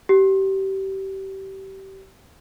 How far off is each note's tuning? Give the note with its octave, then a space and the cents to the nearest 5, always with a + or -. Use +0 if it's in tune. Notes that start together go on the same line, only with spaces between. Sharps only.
G4 -30